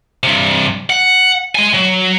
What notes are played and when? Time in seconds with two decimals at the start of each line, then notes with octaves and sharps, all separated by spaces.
0.23 G2 C3
0.90 F#5
1.55 G#3 G#5
1.74 F#3